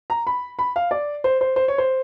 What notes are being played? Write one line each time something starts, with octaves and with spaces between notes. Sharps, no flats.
A#5
B5
B5
F5
D5
C5
C5
C5
C#5
C5